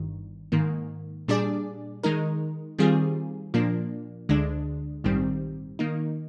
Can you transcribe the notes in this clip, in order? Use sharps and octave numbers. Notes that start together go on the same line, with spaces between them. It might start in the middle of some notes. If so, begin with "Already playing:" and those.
Already playing: G1 G2 D#3
G#2 D#3 A#3
A#2 G3 D4 G#4 D5
D#3 G#3 D#4 A#4
D#3 G3 C4 F4 G#4
A#2 F3 A#3 D4
D2 D3 G#3 D4
A#1 G#2 D#3 G3 C4
D#3 A#3 D#4